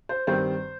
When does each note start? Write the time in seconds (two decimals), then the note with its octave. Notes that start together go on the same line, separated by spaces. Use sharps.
0.09 C5
0.27 G2 D#3 G3 C4 C5